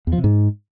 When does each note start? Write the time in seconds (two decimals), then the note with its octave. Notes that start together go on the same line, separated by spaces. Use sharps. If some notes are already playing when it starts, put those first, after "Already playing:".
0.07 E2
0.13 F3
0.18 C3
0.24 G#2